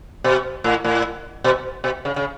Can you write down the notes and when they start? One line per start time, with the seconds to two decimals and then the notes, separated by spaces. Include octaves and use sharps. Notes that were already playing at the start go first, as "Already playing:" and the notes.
0.24 B2
0.64 A2
0.84 A2
1.44 B2
1.84 B2
2.05 C#3
2.16 C#3